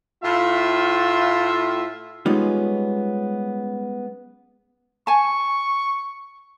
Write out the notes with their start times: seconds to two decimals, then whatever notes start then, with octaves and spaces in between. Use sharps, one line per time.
0.23 A2 F4 E5
2.26 G3 G#3 B3 C#4 D#4 F4
5.07 G#5 A5 C#6